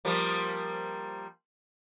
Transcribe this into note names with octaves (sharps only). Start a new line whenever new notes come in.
F3 G3 A#3